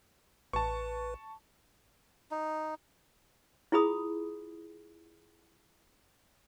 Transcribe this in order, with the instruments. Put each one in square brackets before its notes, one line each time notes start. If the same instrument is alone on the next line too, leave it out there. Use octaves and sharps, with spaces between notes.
[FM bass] A1 [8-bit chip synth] B4 [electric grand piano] A5 C#6
[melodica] D#4
[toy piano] E4 F4 G#4 B5 D#6